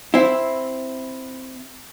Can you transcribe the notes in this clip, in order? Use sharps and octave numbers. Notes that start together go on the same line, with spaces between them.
C4 E4